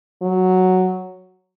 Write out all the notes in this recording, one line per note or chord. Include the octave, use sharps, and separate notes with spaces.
F#3